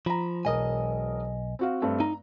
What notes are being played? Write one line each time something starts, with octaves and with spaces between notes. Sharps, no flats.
F3 A#5 B5
E1 B1 A#4 D#5 G#5 D#6
C4 F#4 F5
G2 A3 C4
D#4 A#5